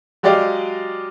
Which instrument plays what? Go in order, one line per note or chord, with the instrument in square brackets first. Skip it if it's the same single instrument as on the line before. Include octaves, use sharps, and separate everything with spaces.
[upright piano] F#3 G#3 G4 D5 D#5 F5